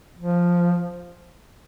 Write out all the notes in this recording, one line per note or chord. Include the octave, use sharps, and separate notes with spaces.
F3